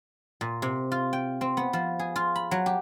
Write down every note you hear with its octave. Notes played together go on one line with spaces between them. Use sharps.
A#2
C3
F4
G5
C4
B3
F3
G#4
F4
B5
F#3
G4